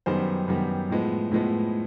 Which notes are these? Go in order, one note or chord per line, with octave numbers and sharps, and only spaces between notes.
F#2 D#3 G3 B3 C5
F#2 D#3 G3 B3
A2 F3 G#3 B3
A2 F3 G#3 B3